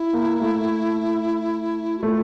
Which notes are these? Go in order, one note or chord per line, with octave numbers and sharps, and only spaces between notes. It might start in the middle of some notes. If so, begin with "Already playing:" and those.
Already playing: E4
A#3
A3
F#4
A3 F4